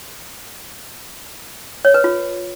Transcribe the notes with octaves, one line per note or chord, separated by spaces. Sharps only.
C#5
B4
F4